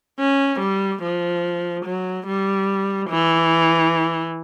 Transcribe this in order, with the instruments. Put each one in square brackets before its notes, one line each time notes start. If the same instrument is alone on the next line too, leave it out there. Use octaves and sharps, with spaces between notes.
[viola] C#4
G3
F3
F#3
G3
E3